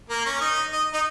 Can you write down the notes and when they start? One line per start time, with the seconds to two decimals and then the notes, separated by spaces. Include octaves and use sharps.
0.10 A#3 A#4
0.25 C#4 C#5
0.40 D#4 D#5
0.73 D#5
0.93 D#4 D#5